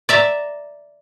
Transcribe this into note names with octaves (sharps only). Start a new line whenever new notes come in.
D5 E5 A#5